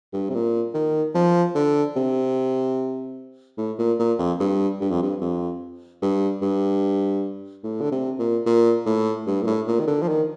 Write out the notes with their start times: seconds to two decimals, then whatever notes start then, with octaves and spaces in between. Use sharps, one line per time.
0.13 G2
0.29 C3
0.34 A#2
0.74 D#3
1.15 F3
1.55 D3
1.96 C3
3.58 A2
3.78 A#2
3.99 A#2
4.19 F2
4.40 G2
4.81 G2
4.90 F2
5.02 G2
5.21 F2
6.02 G2
6.42 G2
7.63 A2
7.81 D3
7.92 C3
8.19 A#2
8.46 A#2
8.86 A2
9.27 G2
9.43 A#2
9.47 A2
9.67 A#2
9.79 D#3
9.87 D3
10.02 F3
10.08 D#3